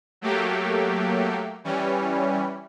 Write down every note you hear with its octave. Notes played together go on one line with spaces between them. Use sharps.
F#3 A3 A#3 G4
E3 G3 C#4